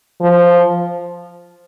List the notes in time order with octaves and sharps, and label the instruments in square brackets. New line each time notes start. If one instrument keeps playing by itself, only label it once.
[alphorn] F3